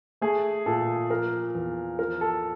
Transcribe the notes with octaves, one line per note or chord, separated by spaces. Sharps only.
A3 G#4
A#2 A4
F3 A#4
E2
F3 A#4
A4